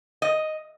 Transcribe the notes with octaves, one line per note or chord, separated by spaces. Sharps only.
D#5